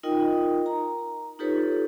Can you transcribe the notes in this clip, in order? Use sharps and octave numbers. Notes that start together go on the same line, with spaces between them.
D#4 F4 A#4 D#5 G5 D#6
A#5
D#4 F4 G4 A4 B4 C#5